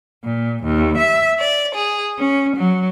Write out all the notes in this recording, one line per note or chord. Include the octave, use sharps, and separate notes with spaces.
A#2
D#2
E5
D5
G#4
C#4
F#3